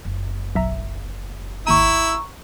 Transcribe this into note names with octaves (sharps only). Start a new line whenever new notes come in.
F#1
B1 E5 A#5
G#1 D#2 E4 A#5 C#6 E6 D#7